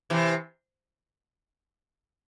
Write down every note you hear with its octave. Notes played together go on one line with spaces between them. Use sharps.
C3 E3